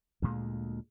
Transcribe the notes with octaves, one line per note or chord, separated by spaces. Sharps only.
D2 A#2 G#3